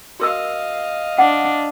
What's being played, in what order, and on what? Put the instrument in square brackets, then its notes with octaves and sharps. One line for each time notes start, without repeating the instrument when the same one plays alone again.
[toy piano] F#4 A#4 E6 [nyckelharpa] D#5 F5
[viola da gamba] D4 [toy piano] F#5